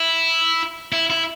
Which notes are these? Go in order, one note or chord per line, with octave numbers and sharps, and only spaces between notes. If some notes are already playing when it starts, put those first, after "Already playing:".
Already playing: E4
E4
E4